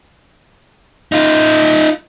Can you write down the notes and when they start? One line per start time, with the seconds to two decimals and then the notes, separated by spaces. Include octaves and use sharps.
1.12 D#4 F4